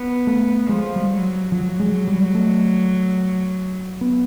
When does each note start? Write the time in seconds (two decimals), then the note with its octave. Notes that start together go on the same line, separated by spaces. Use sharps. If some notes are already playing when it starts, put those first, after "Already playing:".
Already playing: B3
0.27 A3
0.69 F3 G#3
0.96 G3
1.11 F#3
1.52 F3 F#3
1.80 G#3
2.08 G3
2.35 A3
4.01 B3